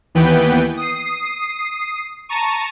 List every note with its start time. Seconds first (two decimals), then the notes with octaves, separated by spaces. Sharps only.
0.15 D#2 E3 B3 B4 G5
0.77 D#6 C7
2.29 A5 A#5 C#6 D#7